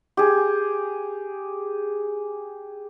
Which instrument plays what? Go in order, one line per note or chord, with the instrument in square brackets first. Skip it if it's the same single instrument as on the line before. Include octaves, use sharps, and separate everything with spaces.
[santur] G4 G#4